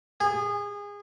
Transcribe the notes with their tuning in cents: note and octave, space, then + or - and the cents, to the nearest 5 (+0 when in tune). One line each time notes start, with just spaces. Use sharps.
G#4 -25